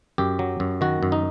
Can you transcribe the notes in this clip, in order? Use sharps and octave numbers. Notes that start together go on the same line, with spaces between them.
F#2 G4
F#3
F#2
D#3 F#4
F#2
D#4